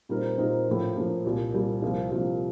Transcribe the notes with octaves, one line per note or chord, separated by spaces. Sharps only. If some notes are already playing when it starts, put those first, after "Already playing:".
A#2 G3 C4 D#4 A#4
A#2 G3 C4 D#4 A#4
A2 F3 A#3
A2 F3 A#3
C2 A#2 G3
C2 A#2 G3
C2 C3 F3 A#3 F4
C2 C3 F3 A#3 F4